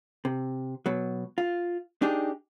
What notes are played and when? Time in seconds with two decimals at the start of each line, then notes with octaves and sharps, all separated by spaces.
0.25 C3
0.86 B2 F#3
1.38 F4
2.02 D4 D#4 G4 G#4